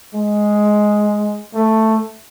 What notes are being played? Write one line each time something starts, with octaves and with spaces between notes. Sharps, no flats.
G#3
A3